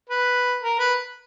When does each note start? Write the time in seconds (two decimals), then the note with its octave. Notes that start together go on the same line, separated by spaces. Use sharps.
0.10 B4
0.62 A#4
0.79 B4